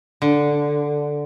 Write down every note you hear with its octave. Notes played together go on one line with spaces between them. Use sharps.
D3